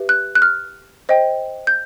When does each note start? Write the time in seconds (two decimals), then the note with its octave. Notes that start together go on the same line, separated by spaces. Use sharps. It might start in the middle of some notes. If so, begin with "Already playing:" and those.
Already playing: G4 B4 E5
0.09 F#6
0.35 F#6
0.42 F6
1.09 C5 D#5 G5
1.67 G6